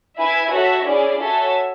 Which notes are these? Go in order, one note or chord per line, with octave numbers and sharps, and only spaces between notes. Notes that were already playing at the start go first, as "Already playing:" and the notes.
E4 B4 E5 G#5
F#4 A4 C#5 E5
C#4 E4 G#4 D5
F#4 A4 C#5 E5 G#5